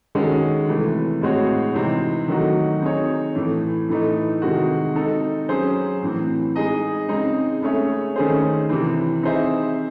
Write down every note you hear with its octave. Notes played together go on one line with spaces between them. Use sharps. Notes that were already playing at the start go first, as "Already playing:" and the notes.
D#3 G#3 C#4 F#4 A4
C3 E3 A3
A2 G#3 C4 F#4 C#5
C3 E3 C4 D#4
D#3 F#3 A3 D#4 F#4
C4 D#4 G#4 C#5
A2 E3 A3
A2 E3 A3 D#4
C3 D#3 G#3 C4 F#4
C4 D#4 A4
F#3 C#4 G#4 C5
A2 E3 C4
G#3 D#4 G#4 D#5
C#3 G#3 C4 D#4
A3 C#4 G#4 C#5 E5
D#3 A3 C#4 G#4 C5
C3 E3 C4
C4 D#4 G#4 C5 E5